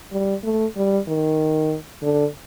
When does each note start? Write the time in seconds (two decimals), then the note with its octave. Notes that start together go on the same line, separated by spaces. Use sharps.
0.12 G3
0.43 A3
0.76 G3
1.08 D#3
2.02 D3